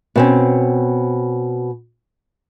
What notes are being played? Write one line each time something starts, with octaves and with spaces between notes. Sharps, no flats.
B2 C4 C#4